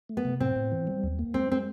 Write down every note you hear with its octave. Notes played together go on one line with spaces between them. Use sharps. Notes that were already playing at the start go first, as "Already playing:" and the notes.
A3
B3
C3
A2 C4
A2
E3
G3
D#2
A#3
G#3 C4
G#3 C4